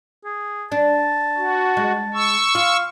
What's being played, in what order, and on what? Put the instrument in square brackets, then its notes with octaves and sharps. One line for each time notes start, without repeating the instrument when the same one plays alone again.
[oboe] G#4
[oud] D4 [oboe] A5
[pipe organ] F#4
[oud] G#3
[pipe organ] C#6 E6
[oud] F4 [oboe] F5